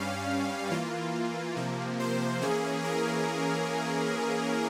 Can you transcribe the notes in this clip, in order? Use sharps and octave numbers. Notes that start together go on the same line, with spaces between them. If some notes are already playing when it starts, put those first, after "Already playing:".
Already playing: G2 G3 C#4 F5
E3 A#3 F4
C3 F3 A#3
C5
E3 A#3 C#4 G#4
A#4